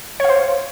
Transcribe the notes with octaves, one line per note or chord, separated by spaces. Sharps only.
C5 C#5 F5